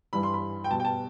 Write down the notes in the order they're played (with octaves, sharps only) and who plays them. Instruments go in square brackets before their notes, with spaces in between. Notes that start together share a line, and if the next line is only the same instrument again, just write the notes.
[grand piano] G2 E3 G3 B5
C6
B5
G5
B2 G3 A5
G5
A5